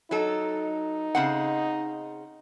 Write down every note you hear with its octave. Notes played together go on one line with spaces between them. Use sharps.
F#3 D#4 A4
C#3 C4 F#5